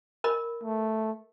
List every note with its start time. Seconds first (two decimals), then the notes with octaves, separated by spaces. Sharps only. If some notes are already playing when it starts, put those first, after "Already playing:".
0.24 A#4 D#5 B5
0.63 A3